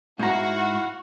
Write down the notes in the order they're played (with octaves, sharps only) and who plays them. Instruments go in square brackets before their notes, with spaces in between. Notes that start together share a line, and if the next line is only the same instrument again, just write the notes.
[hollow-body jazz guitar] G#2 A#5 [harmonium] E4 F5 F#5 [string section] F#4